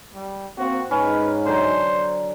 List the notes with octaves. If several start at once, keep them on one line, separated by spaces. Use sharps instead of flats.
G3
A#3 C4 F#4
G#2 C#4 D#4 B4
D3 F#3 C5